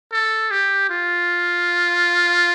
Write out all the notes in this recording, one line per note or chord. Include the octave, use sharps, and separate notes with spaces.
A4
G4
F4